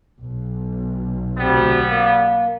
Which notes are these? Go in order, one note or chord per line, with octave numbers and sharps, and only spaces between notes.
B1
D2 C3 G3 B3 C4
A#3